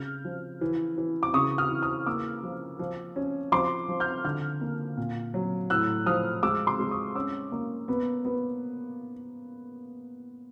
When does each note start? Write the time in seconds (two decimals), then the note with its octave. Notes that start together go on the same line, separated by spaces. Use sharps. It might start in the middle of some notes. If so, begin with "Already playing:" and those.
Already playing: C#3 F6 G6
0.25 F3
0.61 E3
0.98 E3
1.23 D6
1.34 C#3 C#6 D#6
1.58 D#6 F6
1.71 E3
1.82 D#6 F6
2.06 A#3 D6 E6
2.43 F3
2.79 F3
3.16 C#4
3.52 F3 C6 D6
3.88 F3
4.00 F6 G6
4.25 D3 F6 G6
4.61 A#3
4.97 A#2
5.34 F#3
5.70 A2 E6 F#6
6.06 F3 D#6 F6
6.43 G#3 D6 E6
6.67 C6 D6
6.79 G#3
6.91 C#6 D#6
7.15 C#4 D6 E6
7.52 A#3
7.88 B3
8.25 B3